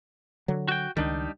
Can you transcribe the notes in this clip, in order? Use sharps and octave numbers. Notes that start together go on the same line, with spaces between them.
D3 F#3
F#4 G5
C#2 D#3 G3 D4 D#4